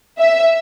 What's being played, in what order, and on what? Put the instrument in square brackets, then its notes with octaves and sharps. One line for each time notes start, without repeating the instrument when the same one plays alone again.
[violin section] E5